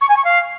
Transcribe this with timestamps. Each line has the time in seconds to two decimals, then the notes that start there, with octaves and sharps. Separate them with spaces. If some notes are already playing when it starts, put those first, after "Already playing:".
0.01 C#6
0.09 G#5
0.17 C#6
0.24 F5